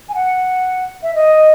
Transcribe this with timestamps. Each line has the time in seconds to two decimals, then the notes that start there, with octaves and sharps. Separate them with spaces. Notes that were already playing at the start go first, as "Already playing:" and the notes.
0.09 G#5
0.15 F#5
1.03 E5
1.15 D#5